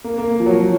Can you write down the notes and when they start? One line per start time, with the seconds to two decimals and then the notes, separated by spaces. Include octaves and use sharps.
0.04 A#3
0.18 A#3
0.40 F3
0.46 F#3
0.60 F3